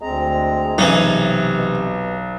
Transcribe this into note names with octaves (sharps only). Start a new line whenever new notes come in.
D2 G#3 C4 A#5
B1 C3 E3 C#4 D#4
B2